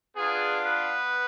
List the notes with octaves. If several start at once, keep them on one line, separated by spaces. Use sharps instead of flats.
B3 D4 F4 G#4
B3 B4